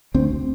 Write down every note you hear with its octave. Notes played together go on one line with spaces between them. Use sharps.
D2 C4